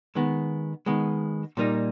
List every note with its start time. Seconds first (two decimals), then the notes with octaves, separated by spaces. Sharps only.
0.15 D#3 G#3 B3
0.86 D#3 G#3 B3
1.57 A#2 G3 A#3 D#4